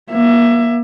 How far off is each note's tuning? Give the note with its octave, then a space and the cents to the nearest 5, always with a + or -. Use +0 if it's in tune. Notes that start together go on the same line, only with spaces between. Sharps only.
A#3 +35 E5 +20